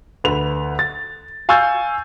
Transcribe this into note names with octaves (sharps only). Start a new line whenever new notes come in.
D2 B4 F7
A6
F5 G#5 C#6 E6 G6 A6